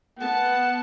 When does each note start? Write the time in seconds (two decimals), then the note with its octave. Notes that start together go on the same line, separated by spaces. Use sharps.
0.19 B3 F#5 A5